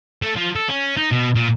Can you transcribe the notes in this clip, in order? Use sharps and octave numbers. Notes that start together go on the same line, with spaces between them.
A3
F3
A4
C#4
D#4
B2
A#2